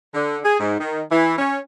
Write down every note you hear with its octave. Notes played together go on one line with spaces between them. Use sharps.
D3
G#4
G#2
D#3
E3
C#4